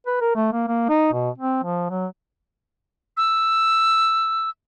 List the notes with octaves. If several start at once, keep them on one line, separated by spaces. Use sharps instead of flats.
B4
A#4
A3
A#3
A#3
D#4
B2
C4
F3
F#3
E6